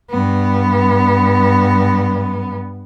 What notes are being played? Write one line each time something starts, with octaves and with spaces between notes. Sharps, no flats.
G2 B3